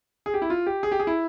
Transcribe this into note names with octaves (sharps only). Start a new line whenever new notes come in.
G#4
G4
E4
F4
G4
G#4
G4
G#4
E4